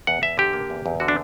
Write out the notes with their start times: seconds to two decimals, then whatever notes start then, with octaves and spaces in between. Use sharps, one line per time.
0.07 E2 F#5
0.22 E2 E5
0.38 D3 G4
0.53 A#3
0.70 E2
0.86 E2
1.00 D3 F#4
1.08 D4